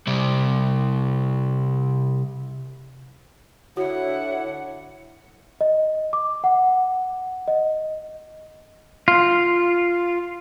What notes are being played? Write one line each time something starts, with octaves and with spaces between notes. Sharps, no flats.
C3 G3
D3 D4 E4 F#4 C#5 F#5
D#5
D6
F#5
D#5
F4